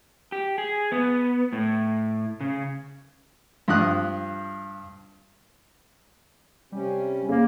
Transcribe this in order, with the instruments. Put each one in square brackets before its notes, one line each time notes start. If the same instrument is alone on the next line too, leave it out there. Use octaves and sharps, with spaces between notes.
[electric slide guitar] G4
G#4
B3
A2
C#3
[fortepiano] G2 F3 D#6 F#6
[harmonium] C3 C#4 [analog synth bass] G3
[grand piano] C#3 [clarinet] A#3